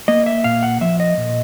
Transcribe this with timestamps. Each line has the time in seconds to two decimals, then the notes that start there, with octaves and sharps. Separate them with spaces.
0.08 A#3 D#5
0.26 E5
0.44 A#2 F5
0.63 F#5
0.81 F3 E5
1.00 D#5
1.18 A#2